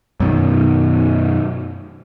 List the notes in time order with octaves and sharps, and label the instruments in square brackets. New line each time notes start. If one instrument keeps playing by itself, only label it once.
[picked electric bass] F#2 B2 D#3